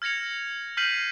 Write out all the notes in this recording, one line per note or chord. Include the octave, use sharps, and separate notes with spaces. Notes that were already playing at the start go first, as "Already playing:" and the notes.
F6 G#6 A#6 C#7 F7
F6 G6 B6 C7 D#7 F#7